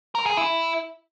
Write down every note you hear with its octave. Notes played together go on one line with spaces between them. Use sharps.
A#4
G#4
E4